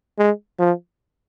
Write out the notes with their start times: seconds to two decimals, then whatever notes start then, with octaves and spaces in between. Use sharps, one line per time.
0.18 G#3
0.59 F3